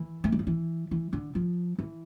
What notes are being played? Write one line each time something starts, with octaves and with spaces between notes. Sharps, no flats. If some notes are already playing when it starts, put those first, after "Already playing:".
Already playing: E3
A3
G#3
F3
E3
E3
D3
F3
E3